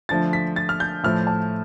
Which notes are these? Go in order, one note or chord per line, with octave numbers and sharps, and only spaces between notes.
D3 F3 A3 A6
B6
A6
F6
G6
A2 F3 A3 F6
A5